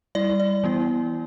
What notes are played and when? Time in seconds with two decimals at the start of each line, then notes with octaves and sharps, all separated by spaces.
0.15 G3 E4 D5
0.40 D5
0.64 E3 B3 E4